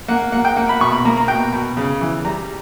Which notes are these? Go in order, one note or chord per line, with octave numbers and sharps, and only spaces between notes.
A#3 F#5
A#3 F#5
G5
A#3 F#5
B5
B2 C#6
B5
A#3 A#5
A#5
B2 G5
B2
C#3
E3
G3 A#5